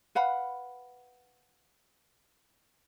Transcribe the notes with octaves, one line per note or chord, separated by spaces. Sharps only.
B4 F5 F#5 B5